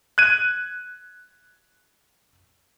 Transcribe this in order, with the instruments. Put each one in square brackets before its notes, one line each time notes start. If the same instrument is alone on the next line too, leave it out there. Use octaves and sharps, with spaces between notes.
[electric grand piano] F#6 G#6 D#7